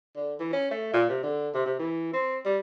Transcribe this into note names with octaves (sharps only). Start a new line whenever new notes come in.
D3
E3
C#4
A3
A#2
C3
D3
C3
C3
E3
C4
G3